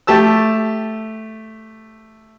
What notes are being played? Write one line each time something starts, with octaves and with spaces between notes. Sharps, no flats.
A3 G4 A5 E6